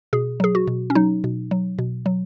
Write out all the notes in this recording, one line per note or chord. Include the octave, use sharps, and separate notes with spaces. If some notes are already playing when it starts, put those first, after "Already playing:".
B2 G#4
F#3 G#4
F#4
B2
C#4
F#3 D#4
B2
F#3
B2
F#3